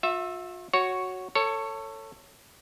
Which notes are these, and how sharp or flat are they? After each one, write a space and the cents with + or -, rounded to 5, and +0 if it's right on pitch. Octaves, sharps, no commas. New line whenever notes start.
F4 +45 E5 +0
F#4 +0 C#5 +0
A4 +25 C#5 +0